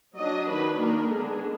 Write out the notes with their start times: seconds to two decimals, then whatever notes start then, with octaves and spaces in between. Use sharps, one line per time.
0.17 F#3 D4 D#5
0.49 D#3 F#3 D4 B4
0.79 D#3 A#3 D4 A#4
1.10 D3 G#3 B3 D4 G#4